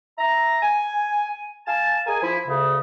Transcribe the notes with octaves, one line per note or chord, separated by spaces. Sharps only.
E5 A#5
G#5
F5 G#5 A5
G#4 A#4 G#5
F3 E4
D2 C#3